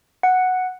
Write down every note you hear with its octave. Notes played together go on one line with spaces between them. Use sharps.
F#5